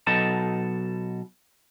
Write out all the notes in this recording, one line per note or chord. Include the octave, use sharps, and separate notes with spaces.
B2 F#3 D#4 A4 A5